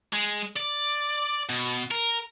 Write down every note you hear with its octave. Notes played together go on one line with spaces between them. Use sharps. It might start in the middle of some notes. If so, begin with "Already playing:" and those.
G#3
D5
B2
A#4